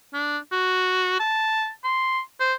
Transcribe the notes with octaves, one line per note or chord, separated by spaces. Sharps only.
D4
F#4
A5
C6
C5